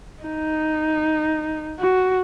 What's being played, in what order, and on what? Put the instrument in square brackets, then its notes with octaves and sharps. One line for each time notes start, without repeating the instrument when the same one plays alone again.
[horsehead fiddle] D#4
F#4